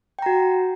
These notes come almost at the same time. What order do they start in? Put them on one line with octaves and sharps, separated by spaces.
G5 A#5 F#4